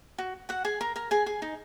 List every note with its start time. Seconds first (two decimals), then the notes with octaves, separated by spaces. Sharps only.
0.18 F#4
0.49 F#4 F#5
0.65 G#4 G#5
0.81 A#4 A#5
0.96 A#4 A#5
1.11 G#4 G#5
1.26 G#4 G#5
1.42 D#4 D#5